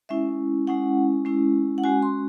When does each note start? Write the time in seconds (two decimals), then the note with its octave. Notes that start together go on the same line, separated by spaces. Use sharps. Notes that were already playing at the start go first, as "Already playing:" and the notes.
0.09 G#3 C#4 E4 E5
0.67 G#3 C#4 E4 F#5
1.25 G#3 C#4 E4
1.78 F#5
1.84 G#3 C#4 F#4 G#5
2.02 C6